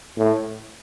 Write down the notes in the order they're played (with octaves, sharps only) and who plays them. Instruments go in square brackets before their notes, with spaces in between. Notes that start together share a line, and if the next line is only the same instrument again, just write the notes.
[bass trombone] A2